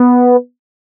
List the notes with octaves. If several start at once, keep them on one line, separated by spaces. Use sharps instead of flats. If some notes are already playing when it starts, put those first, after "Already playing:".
Already playing: B3